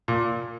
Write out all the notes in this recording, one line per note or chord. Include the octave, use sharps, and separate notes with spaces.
A#2